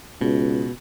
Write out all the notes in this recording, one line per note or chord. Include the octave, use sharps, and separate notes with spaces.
C#2 B2